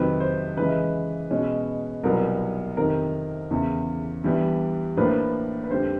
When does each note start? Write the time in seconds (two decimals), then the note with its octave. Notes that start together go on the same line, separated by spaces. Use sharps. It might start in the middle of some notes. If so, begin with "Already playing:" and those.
Already playing: F2 C3 D#3 F#3 B4
0.20 C5
0.57 C#3 E3 G#3 B4
1.31 B2 G#3 C#4
2.03 C2 B2 F#3 B3 A#4
2.77 F2 C3 D#3 A#4
3.51 E2 C#3 E3
4.24 G2 E3 G3 B3
4.97 A2 F3 A#3 D4 B4
5.64 B4
5.70 F2 D3 G3 C5